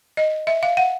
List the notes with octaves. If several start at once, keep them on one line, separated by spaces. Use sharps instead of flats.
D#5
E5
F5
F#5